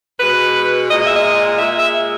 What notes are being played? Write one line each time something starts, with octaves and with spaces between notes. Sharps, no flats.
B2 G#3 B4
A#2 G#3 D#5
E5
D#5
A#2 G#3 E5
E5